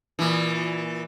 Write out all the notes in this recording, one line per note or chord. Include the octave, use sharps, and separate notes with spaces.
A#2 E3